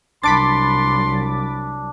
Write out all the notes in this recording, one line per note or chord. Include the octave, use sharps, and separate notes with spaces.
C2 F#3 D4 B5 C6 D6 A6